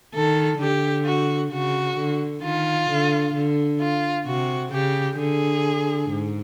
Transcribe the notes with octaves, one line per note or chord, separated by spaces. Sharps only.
D#3 A4
D3 G4
F#4
C#3 F#4
D3
D#3 F4
D3
D3
F4
C3 F#4
C#3 G4
D3 G#4
G#2